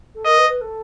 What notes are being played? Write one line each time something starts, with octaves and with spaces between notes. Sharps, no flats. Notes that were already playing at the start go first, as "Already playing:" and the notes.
A4
A#4 D#5
B4
B4
A4